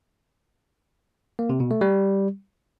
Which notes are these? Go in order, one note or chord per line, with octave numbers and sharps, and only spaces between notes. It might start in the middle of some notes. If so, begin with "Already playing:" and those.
A#3
C3
B2
A3
G3